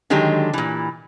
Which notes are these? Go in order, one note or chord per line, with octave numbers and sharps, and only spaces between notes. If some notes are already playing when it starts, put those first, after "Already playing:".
D3 D#3 F#3 G#3 G4
A#2 E3